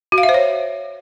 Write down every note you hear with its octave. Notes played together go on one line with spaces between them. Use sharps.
F#4
F5
E5
C5
C#5